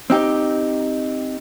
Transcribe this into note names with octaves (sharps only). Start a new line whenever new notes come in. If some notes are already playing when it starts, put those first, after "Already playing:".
C4 D#4 G4